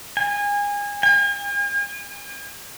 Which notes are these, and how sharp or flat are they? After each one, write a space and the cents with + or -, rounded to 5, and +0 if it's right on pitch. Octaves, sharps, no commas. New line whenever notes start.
G#5 -25
G#5 -45